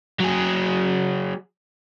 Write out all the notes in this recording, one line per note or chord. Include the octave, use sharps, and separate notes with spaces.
F#3 G#4